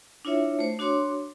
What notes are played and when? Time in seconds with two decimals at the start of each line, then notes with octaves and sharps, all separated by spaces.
0.25 D4 E4 F4 C#5 E5
0.59 A3 C5
0.79 D4 F#4 C#5 C6 D6